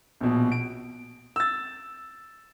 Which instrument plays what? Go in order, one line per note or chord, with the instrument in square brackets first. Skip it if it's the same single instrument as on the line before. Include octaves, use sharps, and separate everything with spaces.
[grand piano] A#1 B2
D7
E6 A6